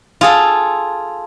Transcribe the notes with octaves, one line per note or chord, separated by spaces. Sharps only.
F4 G#4 A4